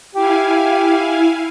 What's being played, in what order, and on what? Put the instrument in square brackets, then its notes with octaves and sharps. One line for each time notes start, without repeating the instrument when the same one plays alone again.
[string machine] E4 F5 G#5 [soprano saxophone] G4